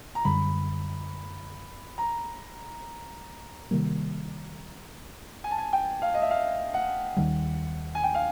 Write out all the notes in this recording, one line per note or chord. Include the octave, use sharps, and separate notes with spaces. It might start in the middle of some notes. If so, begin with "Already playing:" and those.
A#5
F#2 D3 G3 B5
A#5
C3 D#3 G3 A#3
G#5
A5
G#5
G5
F5
D#5
E5
F5
F#5
D#2 D#3 G3
G#5
G5
F5